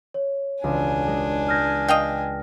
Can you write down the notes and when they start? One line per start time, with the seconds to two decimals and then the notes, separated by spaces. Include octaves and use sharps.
0.14 C#5
0.64 E1 C#2 D4 G#5
1.07 G#3
1.48 D#6 F6 G6 G#6 A#6
1.88 D#5 F5 G5 D#6